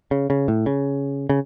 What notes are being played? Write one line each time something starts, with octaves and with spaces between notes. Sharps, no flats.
C#3
C#3
A2
C#3
C#3